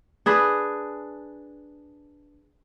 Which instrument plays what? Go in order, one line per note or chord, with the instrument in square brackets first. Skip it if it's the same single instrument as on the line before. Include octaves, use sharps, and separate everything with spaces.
[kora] D4 G#4 B4